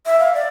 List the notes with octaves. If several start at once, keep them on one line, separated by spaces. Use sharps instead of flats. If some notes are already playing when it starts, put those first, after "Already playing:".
E5
F5
D5